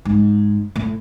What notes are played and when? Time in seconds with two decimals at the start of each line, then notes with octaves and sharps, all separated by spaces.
0.05 G#2
0.76 A2